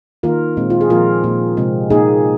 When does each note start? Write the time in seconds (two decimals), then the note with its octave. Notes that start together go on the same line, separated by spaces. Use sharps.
0.23 D#3 A#3 F4 A#4
0.57 A#2 G#3 C4
0.70 F4
0.81 G#4
0.90 A#2 F3 A#3 F4 A#4
1.24 A#2 A#3
1.57 C3 G#3 C4
1.90 A#2 A#3 D#4 G#4